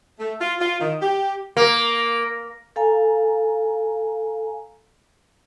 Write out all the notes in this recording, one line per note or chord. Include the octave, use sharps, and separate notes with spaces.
A3
F4
F4
D#3
G4
A#3
A4 F5 G#5 A#5